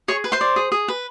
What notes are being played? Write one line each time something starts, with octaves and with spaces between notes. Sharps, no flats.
G#4 C#5 C#6
B4
C5 C6
D5
G#4
G#4
B4